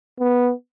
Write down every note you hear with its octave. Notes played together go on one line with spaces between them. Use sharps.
B3